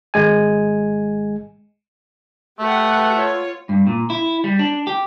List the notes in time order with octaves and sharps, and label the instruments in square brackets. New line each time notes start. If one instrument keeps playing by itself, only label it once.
[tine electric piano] G#1 G#3 G#5
[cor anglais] A3 [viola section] G4 B4 F#5
[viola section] F4 C#5
[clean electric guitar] G2
A#2
E4
G3
D4
G4